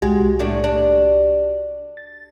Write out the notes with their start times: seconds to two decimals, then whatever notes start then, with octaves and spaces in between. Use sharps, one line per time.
0.02 C2 G#3 F#4 G4
0.39 A2 A3 D4
0.64 D4
1.97 A6